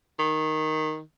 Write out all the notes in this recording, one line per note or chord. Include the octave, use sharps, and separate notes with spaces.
D#3